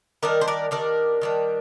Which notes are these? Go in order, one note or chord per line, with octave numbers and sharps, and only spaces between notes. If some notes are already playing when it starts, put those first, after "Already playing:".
D#3 G3 D4 A#4 D5
C5
A#4 D5
D#3 G3 D4 A#4 D5
D#3 G3 D4